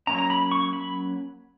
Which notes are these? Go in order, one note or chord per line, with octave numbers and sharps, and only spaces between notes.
F#3 A#3 C#4 A#5
A#5
B5
C#6
B5